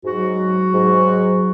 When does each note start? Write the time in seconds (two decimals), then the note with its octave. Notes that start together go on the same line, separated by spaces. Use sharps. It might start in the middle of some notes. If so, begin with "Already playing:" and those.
0.04 G#2 F#3 F#4
0.73 G#2 F#3